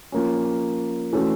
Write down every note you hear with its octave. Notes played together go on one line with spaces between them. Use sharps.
F3 A#3 C#4
E3 A3 C#4 F#4 A4